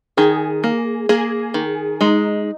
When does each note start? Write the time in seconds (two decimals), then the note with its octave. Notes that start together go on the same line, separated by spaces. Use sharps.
0.17 D#3 G#4
0.64 A#3
1.09 A#3 G#4
1.54 D#3
2.01 G#3 D#4